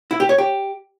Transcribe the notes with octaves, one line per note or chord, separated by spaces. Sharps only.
E4
G4
C#5
G4